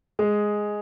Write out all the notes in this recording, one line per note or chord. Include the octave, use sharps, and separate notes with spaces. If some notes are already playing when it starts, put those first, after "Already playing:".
G#3 G#4